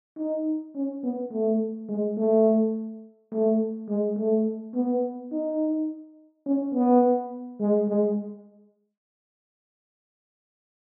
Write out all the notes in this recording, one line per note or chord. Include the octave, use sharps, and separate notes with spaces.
D#4
C#4
B3
A3
G#3
A3
A3
G#3
A3
B3
D#4
C#4
B3
G#3
G#3